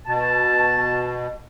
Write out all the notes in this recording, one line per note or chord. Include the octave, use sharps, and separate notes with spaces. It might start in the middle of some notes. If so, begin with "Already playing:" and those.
B2 A5